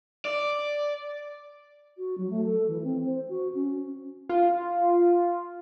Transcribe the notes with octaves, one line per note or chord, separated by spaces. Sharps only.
D5
F#4
F#3
A3
A4
E3
C4
C5
F#4
C#4
F4